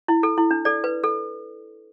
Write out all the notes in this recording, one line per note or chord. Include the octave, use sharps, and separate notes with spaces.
E4
A4
E4
D4
A4 D5
B4
A4